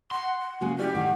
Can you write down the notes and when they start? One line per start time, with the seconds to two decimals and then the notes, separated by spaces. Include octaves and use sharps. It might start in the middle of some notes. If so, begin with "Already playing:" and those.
0.11 F#5 C6
0.40 F#5
0.61 C#3 G#3 A#3 F#4
0.79 G3 C#4 E4 G4 D5
0.95 A2 D#3 G3 F#5